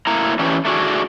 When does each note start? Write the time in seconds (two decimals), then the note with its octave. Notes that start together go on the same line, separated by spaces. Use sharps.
0.07 A2 A#3 E4 A#5
0.39 E3 C#4 D4 G4
0.65 A3 D4 F#4 G#4